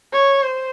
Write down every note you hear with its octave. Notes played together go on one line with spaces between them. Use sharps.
C#5
C5